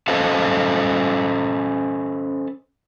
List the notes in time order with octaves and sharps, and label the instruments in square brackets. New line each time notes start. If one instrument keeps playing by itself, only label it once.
[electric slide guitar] C#4 A4 B4 C5 D#5 F5